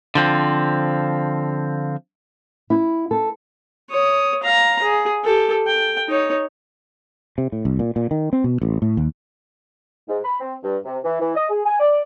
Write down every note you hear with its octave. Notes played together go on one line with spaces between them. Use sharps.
D3 F3 C4
E4
A4
C#5 D#6
F5 A#5
G#4
G4 A4
G5
D#4 C#5
C3
A2
C2
A#2
A#2
D#3
C4
B2
A1
A2
D#2
G#2
B5
C4
G2
C3
E3
E3
D#5
G#4
G#5
D5